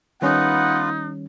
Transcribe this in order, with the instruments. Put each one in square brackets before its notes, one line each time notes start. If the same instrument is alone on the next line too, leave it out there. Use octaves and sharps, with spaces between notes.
[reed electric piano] D#3 G3 C#4 [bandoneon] B3 F4 B4 [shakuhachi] D#4 [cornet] F#5